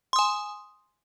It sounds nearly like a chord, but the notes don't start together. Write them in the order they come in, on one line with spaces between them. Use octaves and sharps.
C6 D#6 G#5